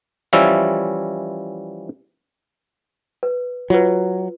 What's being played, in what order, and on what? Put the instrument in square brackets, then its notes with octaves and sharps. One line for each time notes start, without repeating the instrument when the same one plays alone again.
[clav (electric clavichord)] E3 F3 G3 C#4 E5
[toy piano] B4
[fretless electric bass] F#3 [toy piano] F4 B4